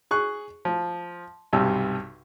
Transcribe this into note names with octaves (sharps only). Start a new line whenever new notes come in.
G#4 C#6 F#6
F3
B1 G2 C3 E6